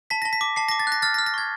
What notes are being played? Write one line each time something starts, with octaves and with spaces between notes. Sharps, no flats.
A5 B6
A5 A#6
B6
D6
A5 C7
D6 A#6
A6
F#6 A#6
F6 A6
A#6
F6
A#6
C#6 G#6